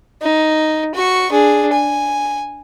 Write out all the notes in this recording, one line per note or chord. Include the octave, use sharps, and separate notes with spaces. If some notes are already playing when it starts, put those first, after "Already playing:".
D#4
F#4 C#6
D4 G#4
G#5